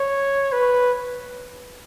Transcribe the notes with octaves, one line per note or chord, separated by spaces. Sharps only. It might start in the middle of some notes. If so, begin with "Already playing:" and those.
Already playing: C#5
B4